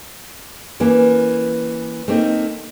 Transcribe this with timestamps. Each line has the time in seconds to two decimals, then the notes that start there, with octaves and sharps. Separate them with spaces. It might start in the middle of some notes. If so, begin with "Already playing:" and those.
0.80 E3 A#3 C#4
2.08 A3 A#3 C4 D#4